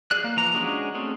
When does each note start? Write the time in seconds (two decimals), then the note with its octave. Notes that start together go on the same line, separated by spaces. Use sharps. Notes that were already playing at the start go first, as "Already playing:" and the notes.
0.11 G#4 D5 F#6
0.24 A#3
0.36 E3 F3 A#5
0.55 G#3 C#4 D4 F#4 G#4
0.95 A3 C4 C#4 G#4